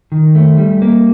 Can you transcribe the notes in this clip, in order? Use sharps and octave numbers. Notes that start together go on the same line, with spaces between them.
D#3
A3
G3
A#3